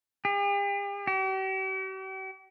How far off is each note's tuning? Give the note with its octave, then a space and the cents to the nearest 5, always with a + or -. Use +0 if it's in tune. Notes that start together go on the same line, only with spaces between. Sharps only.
G4 +45
G4 -45